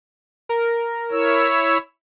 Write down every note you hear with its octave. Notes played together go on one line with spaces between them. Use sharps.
A#4
E4 C#5 E6